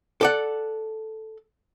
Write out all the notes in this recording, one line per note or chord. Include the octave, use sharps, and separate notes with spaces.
A4 D5 F#5